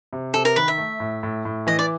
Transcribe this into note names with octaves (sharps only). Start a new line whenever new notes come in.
C3
C3 A4
A#4
D#3 B4
E5
A3
A2
A2
A2
E3 D#5
D5